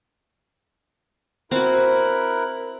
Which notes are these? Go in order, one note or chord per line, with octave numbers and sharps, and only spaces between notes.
C4 E4 F#4 A#4 F#6